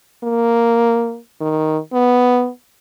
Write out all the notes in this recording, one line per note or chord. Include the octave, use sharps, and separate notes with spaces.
A#3
D#3
B3